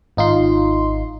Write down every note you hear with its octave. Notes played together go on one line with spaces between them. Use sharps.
G#1 D#4 F4 C6